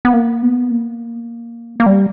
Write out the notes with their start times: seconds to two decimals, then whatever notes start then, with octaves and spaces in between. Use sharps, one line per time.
0.05 B3
0.13 A#3
0.42 B3
0.71 A#3
1.80 A#3
1.86 G3